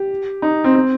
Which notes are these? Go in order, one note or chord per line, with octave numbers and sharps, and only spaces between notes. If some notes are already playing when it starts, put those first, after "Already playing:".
Already playing: G4
D#4
C4
C4